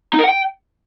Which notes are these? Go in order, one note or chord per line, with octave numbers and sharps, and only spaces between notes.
D#4
A#4
F#5
G5